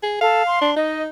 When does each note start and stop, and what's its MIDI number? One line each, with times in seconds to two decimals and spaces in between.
0.03 0.16 68
0.21 0.43 69
0.21 0.60 77
0.47 0.71 84
0.61 0.72 62
0.76 1.08 63
0.76 1.02 75